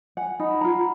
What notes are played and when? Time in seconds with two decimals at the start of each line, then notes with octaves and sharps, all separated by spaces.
0.17 F#5 G#5
0.40 D#4 F#5 B5
0.61 F4 A#5